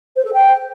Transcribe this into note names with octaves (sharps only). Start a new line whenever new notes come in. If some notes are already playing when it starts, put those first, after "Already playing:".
C5
A4
G5